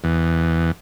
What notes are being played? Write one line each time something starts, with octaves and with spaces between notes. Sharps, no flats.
E2